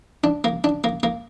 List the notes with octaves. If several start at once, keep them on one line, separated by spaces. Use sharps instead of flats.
D4
A#3
D4
A#3
A#3